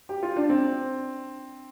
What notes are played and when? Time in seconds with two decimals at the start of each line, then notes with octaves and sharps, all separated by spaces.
0.09 G4
0.23 F4
0.36 D4
0.49 C4